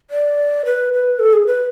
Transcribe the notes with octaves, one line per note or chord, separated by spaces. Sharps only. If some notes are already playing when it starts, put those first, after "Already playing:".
D5
B4
B4
A4
G#4
B4